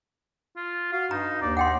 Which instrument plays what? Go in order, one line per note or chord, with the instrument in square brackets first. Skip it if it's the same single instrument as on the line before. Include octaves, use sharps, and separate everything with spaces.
[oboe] F4
[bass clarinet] F#4 [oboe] F5
[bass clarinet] G2 [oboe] D#4 [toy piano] A#5
[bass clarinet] D#2 [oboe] D5
[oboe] D#4 [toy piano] F#5 G5 C6